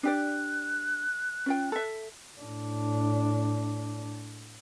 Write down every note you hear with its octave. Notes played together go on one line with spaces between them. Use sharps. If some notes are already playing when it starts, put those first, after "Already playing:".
D4 G4 D5 F#6
C#4 F4 G5
A4 E5
A2 D4